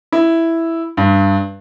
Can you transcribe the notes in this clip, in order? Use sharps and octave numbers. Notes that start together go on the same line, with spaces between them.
E4
G2